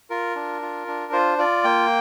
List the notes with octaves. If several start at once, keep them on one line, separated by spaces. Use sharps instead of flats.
F4 A#4
D4
F4
D4
F4 C5
F4 D5
A#3 G5